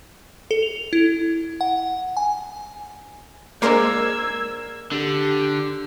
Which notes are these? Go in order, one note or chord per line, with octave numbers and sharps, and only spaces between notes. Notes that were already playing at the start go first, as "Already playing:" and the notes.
A4
F7
E4
F#5
G#5
G#3 A#3 D4 A#4 C5 E6 G#6
D3 G4